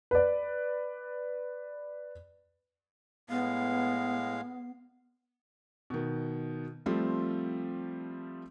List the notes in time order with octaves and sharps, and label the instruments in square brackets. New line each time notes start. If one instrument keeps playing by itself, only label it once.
[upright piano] B4 D5
[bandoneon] A2 G#3 F5 [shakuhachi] B3
[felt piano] B2 D#3
F3 G3 A3 C4 F4